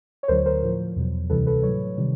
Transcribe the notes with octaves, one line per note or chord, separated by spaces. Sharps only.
C#5
D2 D3 F#3 A#4 C5
A#4 C5
A2 F3
E2 B2 F#3
D2 C3 E3 G3 A4 B4
A4 B4
A2 F#3 B4 C#5
C3 D#3 G3